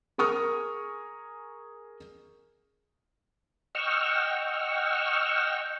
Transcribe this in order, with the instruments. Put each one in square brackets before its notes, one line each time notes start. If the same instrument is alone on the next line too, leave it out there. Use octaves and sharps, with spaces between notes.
[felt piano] G#4 A#4 C#6 D#6 F6
[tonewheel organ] D#5 F#5 G5 C#6 E6 F6